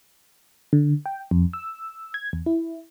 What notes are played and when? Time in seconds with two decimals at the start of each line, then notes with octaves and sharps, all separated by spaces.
0.73 D3
1.06 G5
1.31 F2
1.53 E6
2.14 G#6
2.33 E2
2.46 E4